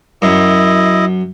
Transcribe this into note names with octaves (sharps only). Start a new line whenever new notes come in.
F#2 E4 D#5